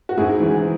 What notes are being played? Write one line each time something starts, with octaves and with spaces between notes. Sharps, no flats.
F#4
G#2 E4 G#4
E3